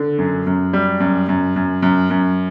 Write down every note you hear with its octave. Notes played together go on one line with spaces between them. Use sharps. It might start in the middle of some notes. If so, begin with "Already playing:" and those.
Already playing: D3
F#2
F#2
G3
F#2
F#2
F#2
F#2
F#2